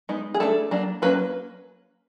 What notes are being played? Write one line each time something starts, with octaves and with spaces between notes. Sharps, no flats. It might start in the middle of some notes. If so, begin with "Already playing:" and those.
G#3 B3 D#4
G#4
A3 D4 A4
F#3 A#3 D4
F#3 A#3 C#4 B4